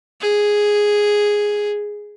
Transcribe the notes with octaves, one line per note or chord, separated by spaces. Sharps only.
G#4